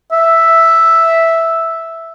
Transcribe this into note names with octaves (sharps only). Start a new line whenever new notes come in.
E5